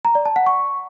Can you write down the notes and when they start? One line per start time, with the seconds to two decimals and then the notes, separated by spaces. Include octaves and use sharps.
0.05 A#5
0.15 D5
0.26 A5
0.36 F#5
0.46 C#6